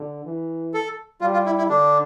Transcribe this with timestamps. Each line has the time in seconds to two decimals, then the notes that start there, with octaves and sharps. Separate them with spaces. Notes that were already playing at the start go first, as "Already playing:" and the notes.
Already playing: D3
0.25 E3
0.74 A4
1.21 G3 F4
1.33 F4
1.46 E4
1.58 E4
1.69 D3 D4